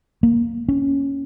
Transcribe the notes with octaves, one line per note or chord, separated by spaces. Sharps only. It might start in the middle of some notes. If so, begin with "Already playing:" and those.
A#3
C#4